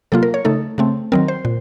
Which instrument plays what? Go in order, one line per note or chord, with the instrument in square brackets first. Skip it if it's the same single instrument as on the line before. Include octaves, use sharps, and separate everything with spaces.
[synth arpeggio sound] C3 F#3 A#3 F4 A4
A#4
C#5
C#3 A3 D#4 A4
C#3 A3 C4
D#3 F#3 C4 A#4
C5
A#2